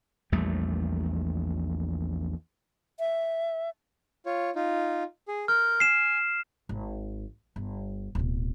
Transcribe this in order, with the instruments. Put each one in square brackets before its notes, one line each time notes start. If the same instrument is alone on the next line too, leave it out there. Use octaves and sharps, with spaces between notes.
[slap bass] A#1 E2 G3 A3
[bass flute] E5
[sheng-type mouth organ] F4 C#5
D#4 F4
G#4
[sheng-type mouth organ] A#4 G6 [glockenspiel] F6
[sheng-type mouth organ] G#5 [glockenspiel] C7 E7
[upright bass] G#1
G1
D1 B2